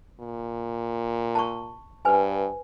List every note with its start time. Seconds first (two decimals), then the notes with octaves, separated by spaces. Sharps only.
0.20 A#2
1.35 A5 C#6
2.05 G2 B4 C5 G#5